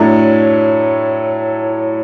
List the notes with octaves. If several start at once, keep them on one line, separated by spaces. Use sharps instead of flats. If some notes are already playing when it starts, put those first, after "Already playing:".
Already playing: A2 F#3 A3 D4